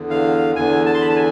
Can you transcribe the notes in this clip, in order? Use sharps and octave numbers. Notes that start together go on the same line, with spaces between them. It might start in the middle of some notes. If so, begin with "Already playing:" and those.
Already playing: E2 D3
F5
E2 D3 G#5
A5
C6
B5
A5
G#5